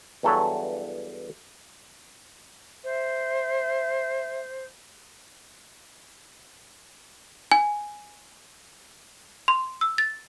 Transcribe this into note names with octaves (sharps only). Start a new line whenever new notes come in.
E2 G2 F#3 A4 B4 C#5
C5 E5
G#5
C6
E6
A6